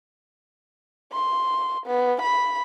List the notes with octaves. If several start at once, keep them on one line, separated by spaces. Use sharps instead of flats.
C6
B3
B5